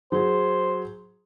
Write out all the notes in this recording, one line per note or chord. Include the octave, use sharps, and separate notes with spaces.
F#3 G#4 C5